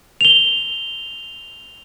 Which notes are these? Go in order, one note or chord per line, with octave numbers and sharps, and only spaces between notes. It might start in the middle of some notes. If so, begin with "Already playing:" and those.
F7 G7